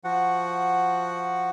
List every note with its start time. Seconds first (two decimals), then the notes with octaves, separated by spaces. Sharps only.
0.04 F3 F#4 F#5